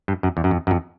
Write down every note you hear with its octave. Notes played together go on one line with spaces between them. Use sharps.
G2
F#2
E2
F#2
F2
F#2
F2